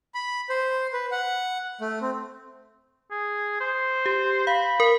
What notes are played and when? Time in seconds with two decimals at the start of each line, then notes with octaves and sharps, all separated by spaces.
0.14 B5
0.49 C5
0.93 B4
1.11 F#5
1.81 A3
2.01 C4
3.11 G#4
3.61 C5
4.06 G4
4.47 F5 B5
4.80 A#4